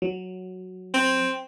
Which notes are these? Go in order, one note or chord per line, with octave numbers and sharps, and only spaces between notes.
F#3
C4